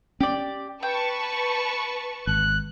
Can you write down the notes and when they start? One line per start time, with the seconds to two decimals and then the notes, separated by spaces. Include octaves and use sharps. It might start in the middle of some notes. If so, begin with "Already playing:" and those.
0.20 C#4 G4 D5
0.83 B4 G5 A5 C#6
2.27 G#1 F#6